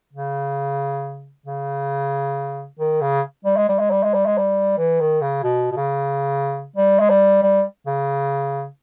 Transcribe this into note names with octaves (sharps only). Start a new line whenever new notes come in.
C#3
C#3
D#3
C#3
G3
G#3
G3
G#3
G3
G#3
G3
G#3
G3
E3
D#3
C#3
B2
B2
C#3
G3
G#3
G3
G3
C#3